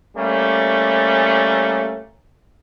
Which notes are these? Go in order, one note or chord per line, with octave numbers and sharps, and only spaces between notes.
G3 A3 A#3 C#4